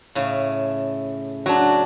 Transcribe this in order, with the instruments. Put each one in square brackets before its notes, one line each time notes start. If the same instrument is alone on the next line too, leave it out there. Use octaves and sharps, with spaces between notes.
[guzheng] A2 C#3
[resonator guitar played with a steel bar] F#3 D4 [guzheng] F#4